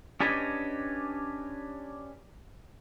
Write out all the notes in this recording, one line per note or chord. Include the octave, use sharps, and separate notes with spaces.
C#4 D4 G4 B4 C#5 D#5